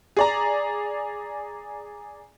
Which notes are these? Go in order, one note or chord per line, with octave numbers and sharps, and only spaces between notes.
G#4 D5 A#5